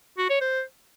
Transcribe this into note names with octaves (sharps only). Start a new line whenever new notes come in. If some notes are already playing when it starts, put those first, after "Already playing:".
F#4
C#5
C5